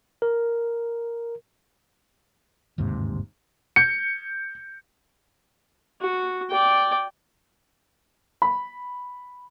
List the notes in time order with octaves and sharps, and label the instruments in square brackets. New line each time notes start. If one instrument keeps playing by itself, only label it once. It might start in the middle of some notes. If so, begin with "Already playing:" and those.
[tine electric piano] A#4
[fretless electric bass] G1 D#2 G#2 C3
[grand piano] G6 C#7
[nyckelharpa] F#4
D5 G5
[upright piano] B5